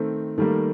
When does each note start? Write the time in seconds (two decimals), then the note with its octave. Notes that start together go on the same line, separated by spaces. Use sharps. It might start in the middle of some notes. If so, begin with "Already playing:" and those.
Already playing: D#3 A3 C4
0.38 D#3 G3 A3 A#3 A4